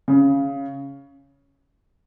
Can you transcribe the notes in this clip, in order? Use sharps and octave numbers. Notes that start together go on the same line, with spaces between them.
C#3